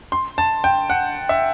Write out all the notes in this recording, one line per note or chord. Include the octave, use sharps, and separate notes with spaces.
C6
A5
G5
F#5
E5